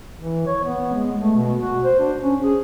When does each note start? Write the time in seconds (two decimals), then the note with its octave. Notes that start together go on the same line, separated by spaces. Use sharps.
0.19 E3
0.47 C#5
0.64 B3
0.93 G#3
1.22 A3
1.36 B2
1.61 F#4
1.84 C5
1.99 D4
2.21 C#4
2.42 G#4